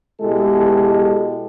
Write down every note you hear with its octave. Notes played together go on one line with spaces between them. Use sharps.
B2 G#3 E4 G4 A4